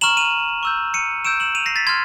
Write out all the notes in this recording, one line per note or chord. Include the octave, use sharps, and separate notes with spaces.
A#5 C#6 F6 E7 F#7
D#7 F7
C#6 E6 G6
C#7 D#7
C#6 E6 G6 D7 E7
E7 F#7
D#7 F7
A#6 C7
A6 B6
C6 F6 G#6